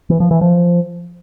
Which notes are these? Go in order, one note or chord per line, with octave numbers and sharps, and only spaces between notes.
E3
F3
E3
F3